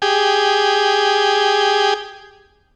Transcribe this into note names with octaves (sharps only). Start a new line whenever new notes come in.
G4 G#4